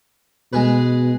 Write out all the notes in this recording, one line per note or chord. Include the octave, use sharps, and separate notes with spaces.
B2 G#3 G#4 B4